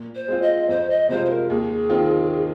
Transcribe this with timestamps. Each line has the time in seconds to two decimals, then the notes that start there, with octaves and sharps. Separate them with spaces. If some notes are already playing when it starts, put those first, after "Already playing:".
Already playing: A#2
0.15 C5
0.28 G#3 C4 F4
0.42 D#5
0.69 F2 C5
0.90 D#5
1.09 C3 G#3 F4 C5
1.25 C5
1.29 A#4
1.49 D#2 G#4
1.90 D#3 C4 F4